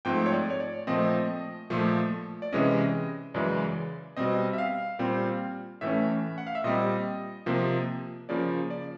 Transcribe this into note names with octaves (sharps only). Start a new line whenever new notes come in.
G#2 F3 A3 C4 G5
C#5
D5
C#5
D5
A#2 F3 A3 C4 D#5
A#2 F3 A3
D5
C3 E3 G#3 C#4 D#5
F#2 C#3 E3 G#3 D5
B2 G3 C4 D#5
E5
F5
A#2 G3 C4
A2 E3 A3 C#4 E5
F#5
F5
E5
A#2 G3 C4 D#5
C3 F3 A#3
C#3 F3 A#3 D5
D5